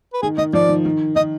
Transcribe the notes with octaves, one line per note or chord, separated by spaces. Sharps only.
B4
D#3 G#4
D#3 D#5
F3 D5
D#3
D#3
D#3 D#5